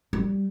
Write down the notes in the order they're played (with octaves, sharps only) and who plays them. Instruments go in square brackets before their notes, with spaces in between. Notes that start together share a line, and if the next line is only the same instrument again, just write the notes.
[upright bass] G3